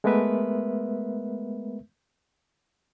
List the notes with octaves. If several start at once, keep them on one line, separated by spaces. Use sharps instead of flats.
G#3 A3 B3 A#4 B4 E5